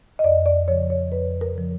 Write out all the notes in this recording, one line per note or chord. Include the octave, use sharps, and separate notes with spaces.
D#5
F2 D5
D5
C#3 F3 C#5
C#5
F2 B4
A#4
C#3 F3